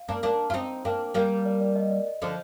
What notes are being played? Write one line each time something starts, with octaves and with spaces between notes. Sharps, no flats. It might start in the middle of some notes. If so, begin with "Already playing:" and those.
Already playing: F5
A#3 D4
A#3 D4
F4
C4 D#4
A#3 D4 G5
G3 A#3 A#4
A#4
D5
D5
D#5
D5
D#5
D3 F3